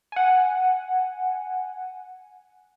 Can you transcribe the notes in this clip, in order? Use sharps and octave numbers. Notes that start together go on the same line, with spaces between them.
F#5 G#5